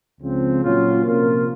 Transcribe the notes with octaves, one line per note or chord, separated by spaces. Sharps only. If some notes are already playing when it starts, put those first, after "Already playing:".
C#2 C#3 F3 C4
A#2 F#3 C#4 F4
C3 F3 A#3 F4 A#4